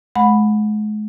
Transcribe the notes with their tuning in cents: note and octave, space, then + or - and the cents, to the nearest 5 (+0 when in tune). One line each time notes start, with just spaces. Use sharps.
G#3 +40 F#5 -25 B5 +0